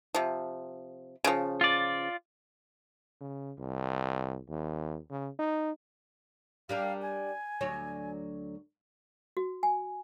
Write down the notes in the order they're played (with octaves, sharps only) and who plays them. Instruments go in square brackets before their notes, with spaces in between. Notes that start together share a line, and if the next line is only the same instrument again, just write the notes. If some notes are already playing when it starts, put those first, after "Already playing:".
[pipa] C3 F3
C#3 F3
[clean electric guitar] F4 D5
[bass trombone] C#3
C2
D#2
C#3
D#4
[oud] G3 D4 A#4 [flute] F5
[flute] G#5
[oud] D2 F#3 C#5
[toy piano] F#4
G#5